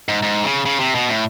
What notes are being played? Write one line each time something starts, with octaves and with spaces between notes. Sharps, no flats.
G#2
G#2
C#3
C#3
C3
B2
A2